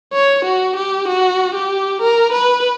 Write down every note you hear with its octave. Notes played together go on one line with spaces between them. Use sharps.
C#5
F#4
G4
F#4
G4
A#4
B4